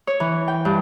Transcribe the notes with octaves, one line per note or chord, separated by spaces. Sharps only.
C#5
E3
G5
G2